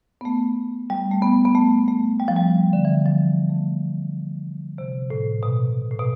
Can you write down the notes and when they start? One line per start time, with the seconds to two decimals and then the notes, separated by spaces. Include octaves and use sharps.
0.21 B3
0.25 A3
0.90 G3
1.11 A3
1.22 B3
1.45 B3
1.55 A3
1.88 A3
2.20 G3
2.28 F3
2.36 G3
2.73 D3
2.85 E3
3.05 F3
3.27 A3
3.50 A3
4.78 C3
5.10 A2
5.43 B2
5.91 A2
5.99 B2